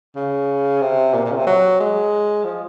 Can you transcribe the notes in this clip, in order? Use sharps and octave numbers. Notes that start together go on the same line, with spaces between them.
C#3
C3
A#2
A#2
C#3
C3
F#3
G#3
F3